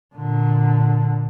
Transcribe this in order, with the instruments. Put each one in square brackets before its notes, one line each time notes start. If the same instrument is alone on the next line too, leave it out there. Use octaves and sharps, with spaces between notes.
[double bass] A#2 D3